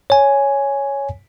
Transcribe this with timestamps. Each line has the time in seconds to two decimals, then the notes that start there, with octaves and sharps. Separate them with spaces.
0.10 C#5 G#5